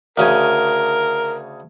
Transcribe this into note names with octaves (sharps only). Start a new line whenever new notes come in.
D2 C#3 A#4 G#5